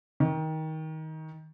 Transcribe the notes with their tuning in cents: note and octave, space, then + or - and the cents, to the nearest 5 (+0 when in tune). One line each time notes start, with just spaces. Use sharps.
D#3 +20